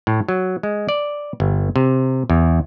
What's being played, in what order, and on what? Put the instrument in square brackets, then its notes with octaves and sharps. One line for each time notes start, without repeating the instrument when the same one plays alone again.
[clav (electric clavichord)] A2
F#3
G#3
D5
G1
C3
E2